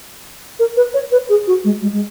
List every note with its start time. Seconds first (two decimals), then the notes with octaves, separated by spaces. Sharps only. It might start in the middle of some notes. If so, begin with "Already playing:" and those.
0.59 A#4
0.77 B4
0.94 C#5
1.12 B4
1.29 G#4
1.47 F#4
1.64 G#3
1.82 G#3
1.93 G#3